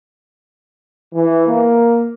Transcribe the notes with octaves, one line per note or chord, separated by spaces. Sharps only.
E3
A#3